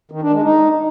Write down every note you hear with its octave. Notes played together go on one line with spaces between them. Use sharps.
D#3
D4
G#3
D#4